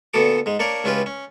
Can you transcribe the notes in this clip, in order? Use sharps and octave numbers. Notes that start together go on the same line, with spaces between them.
A#2 D3 B3 F#4 A4 D6
G#2 G#3
A#3 D4 A#4 C#5 D5
C#2 C#4 E4 F4 G4 B4
C#4